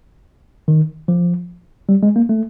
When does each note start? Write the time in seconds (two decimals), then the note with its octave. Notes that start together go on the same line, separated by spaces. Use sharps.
0.68 D#3
1.08 F3
1.89 G3
2.03 G#3
2.16 A#3
2.29 A3